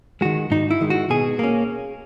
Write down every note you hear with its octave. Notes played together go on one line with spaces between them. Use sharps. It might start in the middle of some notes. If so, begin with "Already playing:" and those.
D#3 G#3 F#4
G#2 D#4
E4
D#3 G#3
F#4
B2 G#4
A#3 C#4